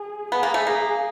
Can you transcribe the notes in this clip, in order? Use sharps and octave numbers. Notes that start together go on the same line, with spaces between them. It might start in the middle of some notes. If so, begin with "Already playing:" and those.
Already playing: G#4
B3 G#4
A#3
A3
A#3